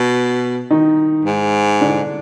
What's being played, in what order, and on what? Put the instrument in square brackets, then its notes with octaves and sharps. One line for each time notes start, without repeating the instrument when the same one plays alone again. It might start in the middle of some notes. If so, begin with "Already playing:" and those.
Already playing: [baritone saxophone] B2
[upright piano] D#3 D#4
[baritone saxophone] G#2
[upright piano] D3 D4